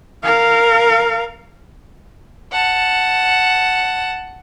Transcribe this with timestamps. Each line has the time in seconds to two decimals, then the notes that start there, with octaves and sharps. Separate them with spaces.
0.24 A#4 F5
2.52 F#5 A5